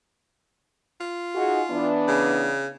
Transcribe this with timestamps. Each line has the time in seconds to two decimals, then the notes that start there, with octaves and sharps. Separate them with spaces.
1.00 F4
1.35 D#4 F#4 G#4
1.71 E3 B3 D4
2.08 C#3